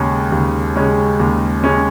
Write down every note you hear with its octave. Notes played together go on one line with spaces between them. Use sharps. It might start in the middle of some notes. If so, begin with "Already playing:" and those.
Already playing: D#2 C#3 G#3 C#4
D#2
C#3 G#3 C#4
D#2
C#3 G#3 C#4